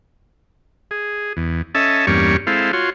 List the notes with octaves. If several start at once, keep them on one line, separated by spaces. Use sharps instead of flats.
G#4
E2
C#4 A4 D#5 E5 A5
E2 G2 G3 A#3 C#4 C#6
G#3 C4 E4 A4 F5
F4 F#4 C#5 C6